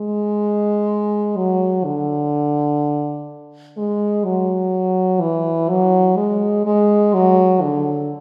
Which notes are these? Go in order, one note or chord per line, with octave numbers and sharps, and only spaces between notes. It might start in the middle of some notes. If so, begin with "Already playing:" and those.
Already playing: G#3
F#3
D3
G#3
F#3
E3
F#3
G#3
G#3
F#3
D3